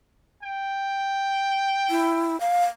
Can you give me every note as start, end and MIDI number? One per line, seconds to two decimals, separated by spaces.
0.43 2.37 79
1.90 2.39 64
2.40 2.64 77